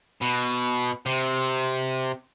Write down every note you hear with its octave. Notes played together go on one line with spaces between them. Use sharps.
B2
C3